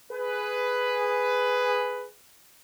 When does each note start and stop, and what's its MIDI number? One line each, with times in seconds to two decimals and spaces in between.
0.12 2.08 68
0.12 2.08 71